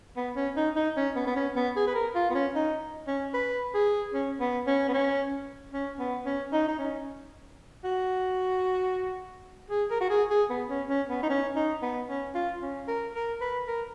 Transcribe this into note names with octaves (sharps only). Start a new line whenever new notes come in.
B3
C#4
D#4
D#4
C#4
B3
B3
C#4
B3
G#4
B4
A#4
F4
B3
C#4
D#4
C#4
B4
G#4
C#4
B3
C#4
B3
C#4
C#4
B3
C#4
D#4
D#4
C#4
F#4
G#4
A#4
F#4
G#4
G#4
B3
C#4
C#4
B3
D#4
C#4
D#4
B3
C#4
F4
C#4
A#4
A#4
B4
A#4